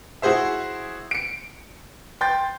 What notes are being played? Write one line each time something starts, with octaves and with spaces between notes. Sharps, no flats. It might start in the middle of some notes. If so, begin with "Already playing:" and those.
E4 F#4 G#4 C5 E5
C#7 D7
G5 C6 G6 A6